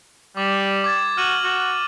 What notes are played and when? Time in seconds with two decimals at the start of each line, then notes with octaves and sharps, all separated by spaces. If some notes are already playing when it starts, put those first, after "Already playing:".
0.37 G3 D6
0.84 D6 G#6 A6
1.17 F#4 F6 D#7 F#7
1.44 F#4